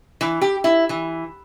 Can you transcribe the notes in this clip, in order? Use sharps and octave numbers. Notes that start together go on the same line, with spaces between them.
E3
G4
E4
E3